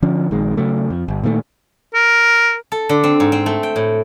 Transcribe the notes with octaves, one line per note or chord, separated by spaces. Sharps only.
D3 F3 C#4
A#1 D#3 G#3
C#3 F#3 A3
F2
G1
A#2 D#3 E3 A3
A#4
A4
D3
C4
G#2
C4
A3
G5
A2